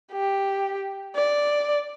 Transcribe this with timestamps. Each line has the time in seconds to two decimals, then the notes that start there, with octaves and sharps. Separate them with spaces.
0.13 G4
1.16 D5